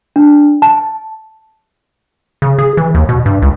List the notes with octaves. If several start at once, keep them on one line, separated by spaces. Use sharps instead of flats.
D4
A5
C#3
G#4
E3
D#2
B2
G2
C#2